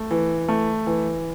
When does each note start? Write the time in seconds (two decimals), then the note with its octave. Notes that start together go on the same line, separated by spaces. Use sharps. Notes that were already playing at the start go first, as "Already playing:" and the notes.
Already playing: A3
0.11 E3
0.48 A3
0.87 E3